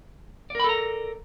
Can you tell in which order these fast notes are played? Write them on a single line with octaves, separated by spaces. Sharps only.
D5 A#4 B5 A4 A#5